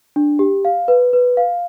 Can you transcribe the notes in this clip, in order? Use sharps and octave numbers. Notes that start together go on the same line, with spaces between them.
D4
G4
F5
B4
B4
F5